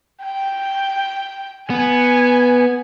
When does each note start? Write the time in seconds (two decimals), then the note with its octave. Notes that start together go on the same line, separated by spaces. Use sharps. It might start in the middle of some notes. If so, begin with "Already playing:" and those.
0.24 G5
1.70 B3 G#5